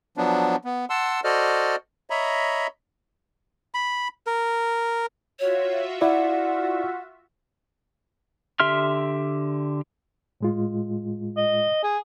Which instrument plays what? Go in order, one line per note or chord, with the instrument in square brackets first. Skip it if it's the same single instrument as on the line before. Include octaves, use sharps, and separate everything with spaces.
[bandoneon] F3 F#3 B3 D4
B3
F#5 A5 C6 E6
F#4 A4 C5 D5 D#5 F6
C#5 D#5 E5 A#5 B5
[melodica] B5
A#4
[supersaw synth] F4 F#4 E5 [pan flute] C#5
[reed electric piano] E4 D5 [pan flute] F#5
[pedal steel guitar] D3 G4 E5 C6 F6
[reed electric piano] A2 G#3 F4
[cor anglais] D#5
G#4